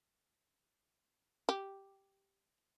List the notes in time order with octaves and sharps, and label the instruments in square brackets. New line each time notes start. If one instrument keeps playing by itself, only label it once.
[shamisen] G4